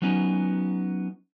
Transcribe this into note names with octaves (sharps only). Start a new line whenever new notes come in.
F#3 B3 C#4 D#4